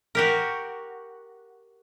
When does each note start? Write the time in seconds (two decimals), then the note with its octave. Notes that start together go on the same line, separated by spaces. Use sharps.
0.15 F#4 G4 A#4